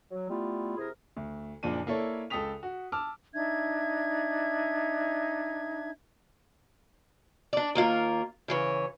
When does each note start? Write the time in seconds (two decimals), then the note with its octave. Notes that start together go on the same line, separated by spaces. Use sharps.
0.11 F#3
0.30 G3 A3 B3 E4 F4
0.77 C3 E4 G#4 A#4
1.17 D2
1.63 F#1 A#2 F3 D4 D#7
1.87 A#3 E4 A4 C#5 D5
2.30 C#2 A4 G5 D#6 B6 F7
2.63 F#4
2.92 A5 D6 E6 F6
3.34 D4 D#4 E5 G#6
7.53 D4 D5
7.75 D#2 A#3 F4 A#4
8.48 C#3 E3 C#5